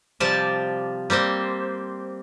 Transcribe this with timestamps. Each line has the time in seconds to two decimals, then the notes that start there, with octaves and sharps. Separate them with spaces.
0.20 C3 F3 G3 D5 A5
1.10 G3 A#3 C4 C5